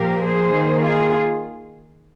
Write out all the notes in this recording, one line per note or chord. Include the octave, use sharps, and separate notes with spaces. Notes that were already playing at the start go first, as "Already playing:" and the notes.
Already playing: A#2 F3 A#3 G4 A#4
G#4 C5
D#3 A#3
F4 G#4